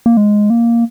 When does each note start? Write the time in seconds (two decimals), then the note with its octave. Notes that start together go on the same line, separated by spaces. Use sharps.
0.06 A#3
0.17 G#3
0.50 A#3